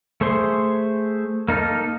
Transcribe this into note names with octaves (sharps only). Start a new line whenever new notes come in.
A3 G#4 C5 C6
A#3 D#4 A4 F6